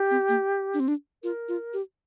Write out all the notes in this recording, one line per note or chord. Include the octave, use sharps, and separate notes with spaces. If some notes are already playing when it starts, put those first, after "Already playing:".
Already playing: G4
C4
A#3
D4
C4
D4
F4 A#4
F4
G4